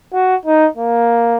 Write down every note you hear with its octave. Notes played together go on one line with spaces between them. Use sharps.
F#4
D#4
A#3